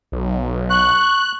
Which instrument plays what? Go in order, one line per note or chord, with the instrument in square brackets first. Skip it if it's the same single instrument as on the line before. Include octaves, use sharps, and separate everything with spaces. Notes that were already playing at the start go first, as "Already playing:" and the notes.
[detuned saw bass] B1
[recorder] C#6 [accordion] F#6